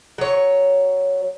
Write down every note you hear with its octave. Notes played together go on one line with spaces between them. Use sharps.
F#3 C#5